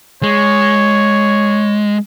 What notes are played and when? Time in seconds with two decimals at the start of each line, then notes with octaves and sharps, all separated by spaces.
0.23 G#3 C#5